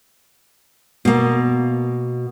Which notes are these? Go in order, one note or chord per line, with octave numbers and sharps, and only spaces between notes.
B2 A#3